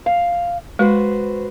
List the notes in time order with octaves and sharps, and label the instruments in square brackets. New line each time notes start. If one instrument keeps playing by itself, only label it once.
[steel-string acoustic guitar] F5
[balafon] G#3 [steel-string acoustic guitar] F#4 B4 C5